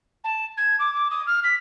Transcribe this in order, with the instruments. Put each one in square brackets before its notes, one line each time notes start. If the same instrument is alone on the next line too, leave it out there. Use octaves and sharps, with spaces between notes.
[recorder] A5
G#6
D6
D6
D#6
F6
B6